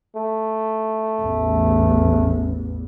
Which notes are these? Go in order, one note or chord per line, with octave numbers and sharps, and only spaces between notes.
A3
A1 E2